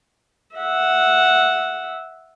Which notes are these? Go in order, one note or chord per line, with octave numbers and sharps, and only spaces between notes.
E5 F#5